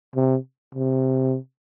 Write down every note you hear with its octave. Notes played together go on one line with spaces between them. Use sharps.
C3
C3